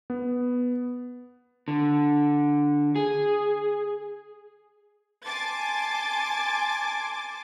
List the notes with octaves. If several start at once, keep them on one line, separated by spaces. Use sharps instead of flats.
B3
D3
G#4
G#5 A5 C6 D6 A6